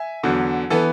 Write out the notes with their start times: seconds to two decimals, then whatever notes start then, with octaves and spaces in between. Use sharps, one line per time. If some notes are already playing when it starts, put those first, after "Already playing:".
Already playing: E5 G#5
0.23 E2 D3 F#3
0.70 E3 B3 A4